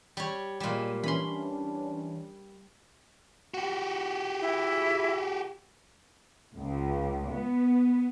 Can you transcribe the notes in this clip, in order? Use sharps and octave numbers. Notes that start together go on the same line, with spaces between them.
G3 C#5
A#2 G3 G#3 D#7 E7
E3 C#4 D4 B5 C6
F#4 G4
E4
C#2
B3